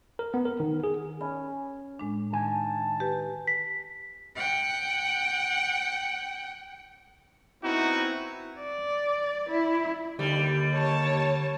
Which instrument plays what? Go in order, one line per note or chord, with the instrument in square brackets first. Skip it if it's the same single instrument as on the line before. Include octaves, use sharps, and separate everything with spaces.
[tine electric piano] A#4
B3
A#4
D#3
G#4
[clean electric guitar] C#4 [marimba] B5
[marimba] A2 G#3 D4
[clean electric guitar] D#3 G#5 [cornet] A5
[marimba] G4 B4
[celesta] B6
[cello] F#5 G5
[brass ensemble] B3 C4 E4 [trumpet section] D#4 F#4
[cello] D5
E4
[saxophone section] D#2 [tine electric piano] D3 [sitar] G3
[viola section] C#5 A5